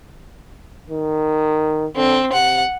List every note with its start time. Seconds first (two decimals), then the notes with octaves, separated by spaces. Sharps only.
0.90 D#3
1.96 D3 C4
2.33 C3 F#5